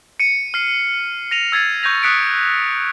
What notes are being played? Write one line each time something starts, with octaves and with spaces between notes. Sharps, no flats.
C#7 D#7
F6 C7
A#6 D#7 F7
E6 G#6 A6 C7 D#7
C#6 G6 G#6 A#6 F7
D#6 F#6 B6 C#7 D7